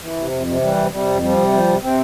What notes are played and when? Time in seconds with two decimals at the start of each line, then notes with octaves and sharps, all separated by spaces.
0.01 E3
0.16 C3
0.31 F2
0.47 C3
0.61 E3 G3
0.77 C3
0.91 C3 G3
1.07 F2
1.22 F3 G3
1.37 C3
1.53 F3
1.67 C3
1.82 C3 C4